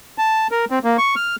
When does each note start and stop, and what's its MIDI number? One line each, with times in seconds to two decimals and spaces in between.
0.18 0.47 81
0.51 0.65 70
0.71 0.79 60
0.84 0.97 58
0.98 1.15 85
1.16 1.36 89